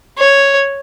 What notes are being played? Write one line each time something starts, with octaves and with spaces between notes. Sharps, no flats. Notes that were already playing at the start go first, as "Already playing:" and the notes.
C#5